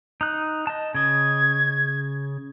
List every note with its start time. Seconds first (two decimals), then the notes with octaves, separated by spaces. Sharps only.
0.21 D#4 F#6
0.67 D#5 A5
0.95 C#3 D#5 G#6